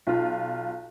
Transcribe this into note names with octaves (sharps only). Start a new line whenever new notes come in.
B1 F4